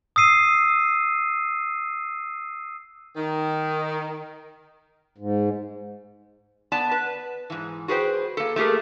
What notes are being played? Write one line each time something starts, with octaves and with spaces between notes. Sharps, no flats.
D#6 E6 C7 D#7
D#3
G#2
B3 D5 A5
B4
G#2 E3
F#4 G#4 B4 C5 G5
A#3 A4
A3 A#3 G4 G#4 A#4